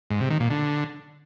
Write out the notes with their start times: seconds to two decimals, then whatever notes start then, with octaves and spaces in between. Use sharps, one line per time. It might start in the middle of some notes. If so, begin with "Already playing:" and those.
0.10 G#2
0.20 C3
0.30 D#3
0.40 A#2
0.50 D3